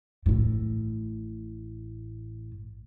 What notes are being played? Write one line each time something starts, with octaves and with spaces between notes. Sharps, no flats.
A1 A2